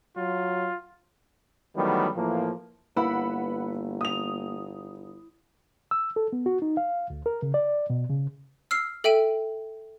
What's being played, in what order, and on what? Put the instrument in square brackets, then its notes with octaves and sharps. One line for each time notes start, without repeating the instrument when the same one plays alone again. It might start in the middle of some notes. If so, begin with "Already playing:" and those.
[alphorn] F#3 [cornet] F4
[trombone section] D#3 E3 F#3 G3 A3 B3
A2 E3 F3 A#3
[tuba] G1 [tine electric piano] A#3 [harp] E4 [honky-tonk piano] B4 F#5 B5
[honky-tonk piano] D#6 F7
[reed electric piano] E6
A4
B3
F#4
D#4
F5
D2
A#4
C#3
D5
B2
C#3
[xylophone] E6 F6 C7
A4 E5 G5 D7 D#7